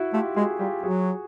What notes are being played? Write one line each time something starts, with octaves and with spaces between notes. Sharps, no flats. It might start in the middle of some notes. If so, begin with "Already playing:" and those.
Already playing: E4 F#4
A3 F4 G4
G#3 F#4 G#4
G3 F4 G4
F#3 F#4 G#4